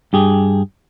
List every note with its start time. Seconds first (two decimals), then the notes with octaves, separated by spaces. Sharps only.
0.13 G2 G4 G#4